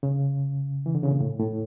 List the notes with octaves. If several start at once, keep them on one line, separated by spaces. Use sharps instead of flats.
C#3
E3
D3
C#3
A#2
A2
A2